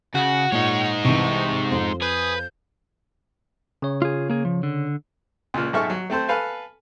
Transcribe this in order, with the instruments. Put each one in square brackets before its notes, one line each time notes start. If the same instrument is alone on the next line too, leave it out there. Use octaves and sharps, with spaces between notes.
[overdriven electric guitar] C#3 [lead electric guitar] F#4 [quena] F#5
[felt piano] A#2 [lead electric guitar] G#3 D#4 [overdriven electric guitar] C#5
[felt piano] C2 G#2 E3 [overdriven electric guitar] C3 [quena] C#6
[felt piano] F2 [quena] C6
[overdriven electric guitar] G#4 [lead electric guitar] B4 [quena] G6
[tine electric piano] C#3 C#5
[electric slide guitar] F4 G#4
A#3 G#4
F3
D3
[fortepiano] C#2 A#2
B1 G#2 A4 E5 C#6 F6
F#3
A3 C4 A4 C5
A4 B4 F5 G#5